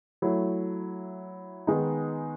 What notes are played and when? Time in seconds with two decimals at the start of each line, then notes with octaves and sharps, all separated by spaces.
0.22 F#3 A3 E4
1.67 D#3 G#3 B3 D#4